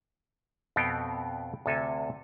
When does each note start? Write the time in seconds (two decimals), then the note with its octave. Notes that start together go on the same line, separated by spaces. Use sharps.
0.76 F2 B2 B3 C4 G5
1.66 D2 C3 A4 G#5